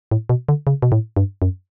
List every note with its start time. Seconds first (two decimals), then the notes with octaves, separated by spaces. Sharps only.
0.11 A2
0.29 B2
0.49 D3
0.67 C#3
0.82 B2
0.92 A2
1.16 G2
1.42 F#2